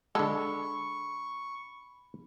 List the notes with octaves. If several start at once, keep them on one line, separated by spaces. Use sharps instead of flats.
D3 G#3 A4 B5 C#6